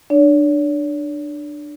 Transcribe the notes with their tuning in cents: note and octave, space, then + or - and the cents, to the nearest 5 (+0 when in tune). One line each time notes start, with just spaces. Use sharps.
D4 +20 C#5 +45